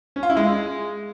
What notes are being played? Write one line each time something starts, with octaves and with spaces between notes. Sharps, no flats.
C#4
F4
E4
G#3